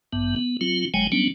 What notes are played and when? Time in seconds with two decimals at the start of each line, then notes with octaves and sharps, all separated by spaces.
0.13 A1 G2 B3
0.36 B3
0.61 F#3 C4 F4
0.94 F#1 F#3 G#3 G5 G#5
1.12 F#3 G3 B3 C#4 D4